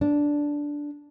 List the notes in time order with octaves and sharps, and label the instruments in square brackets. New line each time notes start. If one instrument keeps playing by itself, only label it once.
[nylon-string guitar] D4